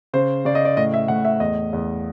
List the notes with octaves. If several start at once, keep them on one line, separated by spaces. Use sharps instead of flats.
C#3 C5
C#3 D5
D#5
D5
A2 D#5
E5
A2 F#5
E5
E2 D#5
E2